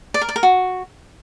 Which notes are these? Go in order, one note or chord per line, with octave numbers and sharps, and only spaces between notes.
D5
A#4
D5
A#4
F#4